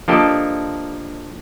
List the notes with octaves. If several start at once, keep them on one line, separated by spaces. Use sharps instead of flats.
F3 A#3 D4 G4 A4 D#5